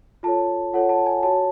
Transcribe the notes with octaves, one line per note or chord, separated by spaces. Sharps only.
F4 A4 C#5 A5
F4 A4 C#5 F#5
A5
G#5
F#4 C#5 A5